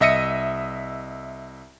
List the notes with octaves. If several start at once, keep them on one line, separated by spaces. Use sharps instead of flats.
C2 D#5 E5 A#6 C#7 D#7